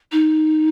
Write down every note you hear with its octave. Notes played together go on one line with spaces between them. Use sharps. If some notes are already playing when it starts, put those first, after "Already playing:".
D#4